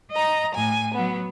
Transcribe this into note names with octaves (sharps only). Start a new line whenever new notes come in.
D#5 A#5
A2 G#5
F#3 B3